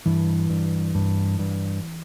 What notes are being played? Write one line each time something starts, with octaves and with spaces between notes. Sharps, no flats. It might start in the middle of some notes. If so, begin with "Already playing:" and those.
G2 E3
G2
G2
G2